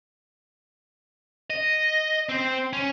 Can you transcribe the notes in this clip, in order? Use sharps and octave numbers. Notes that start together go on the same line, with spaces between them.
D#5
C4 C5
C#4